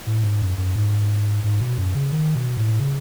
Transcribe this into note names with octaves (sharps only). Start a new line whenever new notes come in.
A2
G#2
F#2
F#2
G#2
G#2
B2
F#2
C#3
D#3
B2
A2
C#3